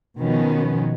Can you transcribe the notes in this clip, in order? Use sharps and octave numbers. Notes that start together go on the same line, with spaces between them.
B2 D#3 F3 B3 C#4